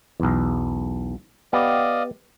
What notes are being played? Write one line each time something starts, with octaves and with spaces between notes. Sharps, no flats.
B1 E2
B3 G4 D5 D#5 F5